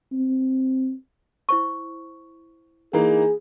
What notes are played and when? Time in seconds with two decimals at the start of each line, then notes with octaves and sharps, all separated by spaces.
0.12 C4
1.49 E4 C5 C#6
2.93 E3 A#3 D#4 G#4